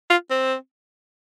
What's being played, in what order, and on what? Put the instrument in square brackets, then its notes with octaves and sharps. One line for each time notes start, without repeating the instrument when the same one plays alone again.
[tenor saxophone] F4
C4